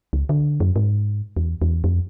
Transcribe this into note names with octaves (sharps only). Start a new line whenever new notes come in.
C#2
D3
F#2
G#2
E2
E2
F2